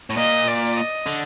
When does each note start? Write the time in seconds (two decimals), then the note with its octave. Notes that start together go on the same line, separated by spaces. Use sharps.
0.10 A2
0.17 A#2 D#5
0.48 D5
0.77 D#5
1.06 D3